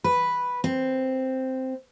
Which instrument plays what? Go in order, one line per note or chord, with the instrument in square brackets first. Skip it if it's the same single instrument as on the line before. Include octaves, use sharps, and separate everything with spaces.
[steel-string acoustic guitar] B4
C4